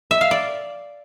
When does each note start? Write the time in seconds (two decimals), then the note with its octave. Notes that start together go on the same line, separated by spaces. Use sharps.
0.11 E5
0.21 F5
0.31 D5